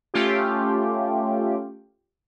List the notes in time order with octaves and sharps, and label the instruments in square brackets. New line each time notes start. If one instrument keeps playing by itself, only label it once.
[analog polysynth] A3 C#4 F4 G4